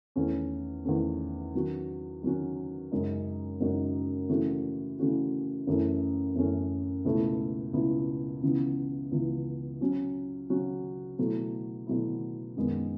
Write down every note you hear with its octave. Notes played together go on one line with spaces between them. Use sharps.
E2 D#3 A3 C#4
E2 D#3 A3 C#4
D#3 F#3 C#4 F#4
D#3 F#3 C#4 F#4
F#2 C#3 G#3 D#4 F#4
F#2 C#3 G#3 D#4 F#4
C#3 E3 A3 C#4 F#4
C#3 E3 A3 C#4 F#4
F#2 E3 A3 C#4
F#2 E3 A3 C#4
C#2 B2 A3 E4
C#2 B2 A3 E4
C#2 C#3 E3 B3
C#2 C#3 E3 B3
C#3 F#3 C#4 F#4
C#3 F#3 C#4 F#4
B2 F#3 A3 E4
B2 F#3 A3 E4
F#2 D#3 G#3 B3